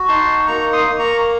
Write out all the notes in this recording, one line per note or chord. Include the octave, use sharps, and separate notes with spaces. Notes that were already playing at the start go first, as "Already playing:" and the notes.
Already playing: F#4
D#4 A5 C6
A#3 A#5 C#6
C6 D#6
A#3
A#5 C#6